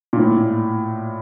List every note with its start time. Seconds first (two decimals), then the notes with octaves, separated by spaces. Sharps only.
0.13 A#2
0.18 A2